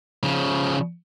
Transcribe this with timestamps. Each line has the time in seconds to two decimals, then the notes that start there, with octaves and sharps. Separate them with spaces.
0.23 C#3 F3